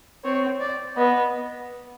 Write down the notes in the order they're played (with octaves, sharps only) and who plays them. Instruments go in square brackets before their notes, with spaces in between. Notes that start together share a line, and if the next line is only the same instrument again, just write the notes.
[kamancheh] C4 [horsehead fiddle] C#5
[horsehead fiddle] D5
[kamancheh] B3 [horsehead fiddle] D#5